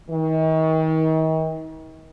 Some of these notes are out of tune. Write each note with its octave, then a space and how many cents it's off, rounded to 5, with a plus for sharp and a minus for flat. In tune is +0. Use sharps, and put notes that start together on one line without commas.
D#3 +40